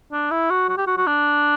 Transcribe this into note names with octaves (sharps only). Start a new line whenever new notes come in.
D4
E4
F#4
F#4
G4
F#4
F#4
D4